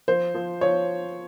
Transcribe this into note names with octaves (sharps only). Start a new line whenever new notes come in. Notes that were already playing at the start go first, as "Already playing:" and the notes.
F3 C5
F3
F3 C#5